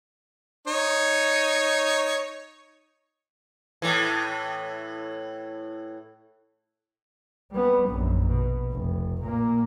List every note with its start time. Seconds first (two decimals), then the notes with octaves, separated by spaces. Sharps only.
0.67 D#4 C#5
3.82 A2 E3
7.51 G3 B3
7.88 A#1 F#2
8.27 B2
8.71 F1
9.24 A#2 A#3